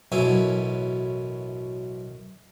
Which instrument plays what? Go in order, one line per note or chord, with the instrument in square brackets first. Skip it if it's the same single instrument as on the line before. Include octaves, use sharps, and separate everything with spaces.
[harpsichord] A1 F#2 B2 F#3 E4 G#5